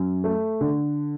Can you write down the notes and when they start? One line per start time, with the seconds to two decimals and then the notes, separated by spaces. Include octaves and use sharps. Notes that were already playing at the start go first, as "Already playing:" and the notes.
Already playing: F#2
0.24 A3
0.61 D3